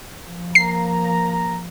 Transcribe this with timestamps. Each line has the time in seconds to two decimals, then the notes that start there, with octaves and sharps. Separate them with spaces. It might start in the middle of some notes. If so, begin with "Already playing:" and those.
0.25 F3
0.55 A#3 A#5 C7